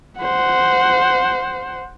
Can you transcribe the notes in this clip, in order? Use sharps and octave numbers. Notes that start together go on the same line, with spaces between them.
C5 F#5